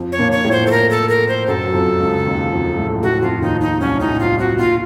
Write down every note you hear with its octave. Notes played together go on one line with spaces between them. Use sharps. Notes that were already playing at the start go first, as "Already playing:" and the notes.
Already playing: F2 F3
C#5
A#2 A#3
C#5
A2 A3
C5
A4
A#4
A4
A#4
C5
F#2 F#3 A4
F#3
F2 F3
C#2 C#3
D#2 D#3
F2 F3
A2 A3
A2 A3 F#4
F2 F3 F4
D#2 D#3 D#4
D#4
C2 C3 C#4
A2 D#4
C2 C3 F4
C2 C3 F#4
A#2 F4